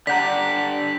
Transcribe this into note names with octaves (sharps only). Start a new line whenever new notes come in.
D3 D4 G4 D5 F#5 A#5 G6 B6